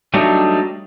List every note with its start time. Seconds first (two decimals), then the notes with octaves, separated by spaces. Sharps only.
0.14 F#3 G3 A3 D4 D#4